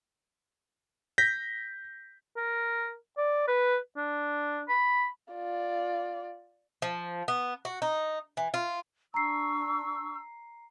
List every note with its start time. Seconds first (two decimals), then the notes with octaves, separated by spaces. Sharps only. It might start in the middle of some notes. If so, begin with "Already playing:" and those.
1.18 G6 A#6 B6
2.37 A#4
3.18 D5
3.48 B4
3.96 D4
4.69 B5
5.33 F4 D5
6.82 F3
7.28 B3
7.65 F#4
7.82 D#4
8.37 E3
8.54 F4
9.14 D4 A#5 C#6 E6 C7